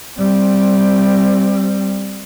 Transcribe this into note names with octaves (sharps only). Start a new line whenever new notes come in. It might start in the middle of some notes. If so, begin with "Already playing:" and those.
G3 C4